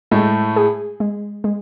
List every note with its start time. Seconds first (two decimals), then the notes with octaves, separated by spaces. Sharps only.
0.11 A2 G#3 A3
0.56 G#4
1.00 G#3
1.44 G#3